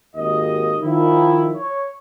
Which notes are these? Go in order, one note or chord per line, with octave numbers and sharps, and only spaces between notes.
G#1 D#2 D#5
D#3 F3 E4
C#5